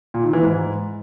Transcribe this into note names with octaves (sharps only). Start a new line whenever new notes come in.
A#2
D#3
E3
G#2